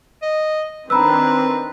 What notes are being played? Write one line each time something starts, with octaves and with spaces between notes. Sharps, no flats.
D#5
D#3 C4 D4 B4 A#5 B5 E6